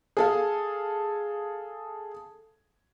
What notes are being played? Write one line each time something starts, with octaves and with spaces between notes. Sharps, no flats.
G#4 A4 F5